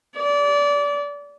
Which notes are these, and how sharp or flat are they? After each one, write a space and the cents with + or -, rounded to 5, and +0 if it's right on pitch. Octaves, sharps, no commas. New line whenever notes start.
D5 -25